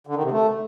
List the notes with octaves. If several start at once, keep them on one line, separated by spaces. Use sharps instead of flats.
D3
D#3
C3
A3